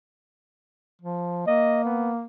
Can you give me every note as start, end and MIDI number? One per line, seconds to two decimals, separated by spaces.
1.02 1.43 53
1.47 2.27 58
1.47 1.84 75
1.85 2.11 59